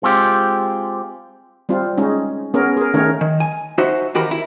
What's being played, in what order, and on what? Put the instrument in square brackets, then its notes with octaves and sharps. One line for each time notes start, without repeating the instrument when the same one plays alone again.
[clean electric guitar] G#3 C4 F4 G4
[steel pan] G3 C4 F4
G#3 C#4 D#4
B3 C#4 G#4 A#4
G#4 A#4
D#3 A3 C#4 D#4 A#4 C#5
[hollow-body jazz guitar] D#3
G#5
D#4 F#4 C5 E5
D#2 E3 F#4 G4 A#4 B5
E4